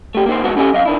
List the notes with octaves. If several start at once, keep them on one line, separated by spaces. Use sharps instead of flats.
A3 G4
A#3 D#4 C5
G#2 B2 D#3 B3 D#4 F#4
C#4 G4 A4 D#5 G#5
F#2 D#5 F5
D#3 D4 E4